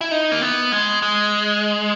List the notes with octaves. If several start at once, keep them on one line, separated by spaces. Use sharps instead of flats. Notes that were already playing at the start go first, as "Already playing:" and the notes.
E4
D#4
A#3
B3
G#3
G#3